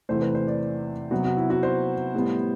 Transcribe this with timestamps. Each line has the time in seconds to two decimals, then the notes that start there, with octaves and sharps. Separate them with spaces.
0.09 E2 C3 E3 A3 C5
0.22 B4
0.35 C5
0.47 D5
1.11 C3 F#3 B3 F#4
1.24 F#4
1.37 E4
1.50 F#4
1.63 C5
2.14 A2 G3 B3